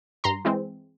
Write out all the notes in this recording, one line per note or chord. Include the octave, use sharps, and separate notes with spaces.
G2 A#5 C6
E3 G#3 C4